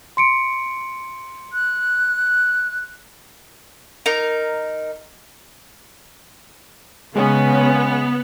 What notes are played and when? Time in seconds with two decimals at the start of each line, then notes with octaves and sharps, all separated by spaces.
0.17 C6 C#7 D7
1.53 F#6
4.06 D#4 A#4
7.16 C#3 G#3 B3 C#4